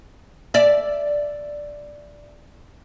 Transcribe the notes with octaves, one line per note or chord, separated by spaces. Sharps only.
D5 E5